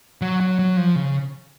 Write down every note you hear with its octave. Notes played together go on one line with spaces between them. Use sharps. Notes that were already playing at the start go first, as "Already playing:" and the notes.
F#3
F#3
F#3
F3
C#3